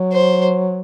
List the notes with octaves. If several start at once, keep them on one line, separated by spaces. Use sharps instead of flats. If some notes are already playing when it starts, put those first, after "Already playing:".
Already playing: F#3
C5